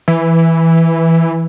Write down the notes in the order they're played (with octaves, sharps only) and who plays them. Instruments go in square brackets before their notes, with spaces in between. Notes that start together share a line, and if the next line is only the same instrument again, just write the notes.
[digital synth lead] E3